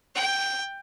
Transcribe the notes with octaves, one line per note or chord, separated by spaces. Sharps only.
G5